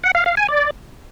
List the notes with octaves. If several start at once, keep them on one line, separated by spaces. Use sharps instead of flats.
F#5
F5
F5
G#5
D5